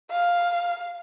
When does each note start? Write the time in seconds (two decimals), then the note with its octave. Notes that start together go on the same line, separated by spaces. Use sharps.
0.11 F5